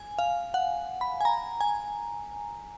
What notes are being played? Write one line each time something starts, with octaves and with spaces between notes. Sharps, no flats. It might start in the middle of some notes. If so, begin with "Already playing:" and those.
Already playing: G#5
F5
F#5
B5
G#5
A#5
G#5